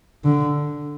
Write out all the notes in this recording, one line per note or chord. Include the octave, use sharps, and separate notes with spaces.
D3